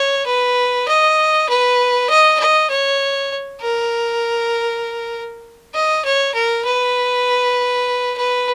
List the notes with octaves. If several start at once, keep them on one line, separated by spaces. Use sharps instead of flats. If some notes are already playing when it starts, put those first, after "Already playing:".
Already playing: C#5
B4
D#5
B4
D#5
D#5
C#5
A#4
D#5
C#5
A#4
B4
B4